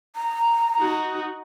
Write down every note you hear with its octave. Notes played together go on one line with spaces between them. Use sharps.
A#5
D#4 F#4